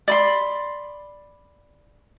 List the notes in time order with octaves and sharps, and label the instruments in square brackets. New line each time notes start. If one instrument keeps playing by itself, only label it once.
[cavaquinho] D5 B5 C6